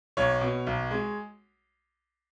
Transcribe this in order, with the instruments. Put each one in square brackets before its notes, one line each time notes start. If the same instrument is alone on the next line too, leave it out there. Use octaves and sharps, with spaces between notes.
[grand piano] B1 C#5
B2
B1
G#3